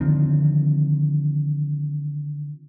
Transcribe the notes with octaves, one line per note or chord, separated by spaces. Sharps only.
D3 D#3 F3 C4